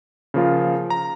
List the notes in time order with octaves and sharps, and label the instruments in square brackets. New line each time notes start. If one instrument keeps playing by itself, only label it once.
[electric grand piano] C#3 F3 A#3 F4
A#5